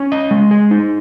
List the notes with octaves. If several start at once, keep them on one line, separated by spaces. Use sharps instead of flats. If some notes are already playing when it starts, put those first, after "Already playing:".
Already playing: C#4
D#5
G#3
G#4
D#4